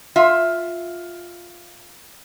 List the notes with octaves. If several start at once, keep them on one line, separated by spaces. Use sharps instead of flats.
F4 E5